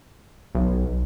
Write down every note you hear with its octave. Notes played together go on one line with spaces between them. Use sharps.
B1